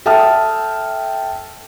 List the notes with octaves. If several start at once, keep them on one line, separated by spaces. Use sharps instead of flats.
A4 E5 G5 A5 D#6 F6